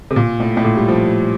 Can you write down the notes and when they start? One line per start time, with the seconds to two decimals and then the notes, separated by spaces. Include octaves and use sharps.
0.11 C3
0.16 A#2
0.40 A2
0.57 A2
0.64 A#2
0.77 G3
0.88 F3